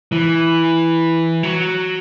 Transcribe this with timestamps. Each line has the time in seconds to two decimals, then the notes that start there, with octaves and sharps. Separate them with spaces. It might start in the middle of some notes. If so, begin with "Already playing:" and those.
0.12 E3
1.43 F#3